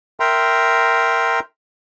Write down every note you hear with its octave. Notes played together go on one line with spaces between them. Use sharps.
A#4 E5 G5 A#5 C6